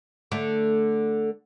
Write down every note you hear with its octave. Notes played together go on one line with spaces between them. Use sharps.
D3 A3